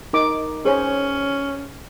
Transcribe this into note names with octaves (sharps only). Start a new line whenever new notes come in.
D#4 A#4 D6
C#4 G#4 C5 C#5